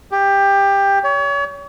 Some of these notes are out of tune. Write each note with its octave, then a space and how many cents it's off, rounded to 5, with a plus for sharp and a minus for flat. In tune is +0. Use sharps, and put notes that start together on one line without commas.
G4 +15
C#5 +35